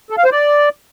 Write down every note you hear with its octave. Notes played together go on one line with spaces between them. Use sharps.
A4
F5
C5
D5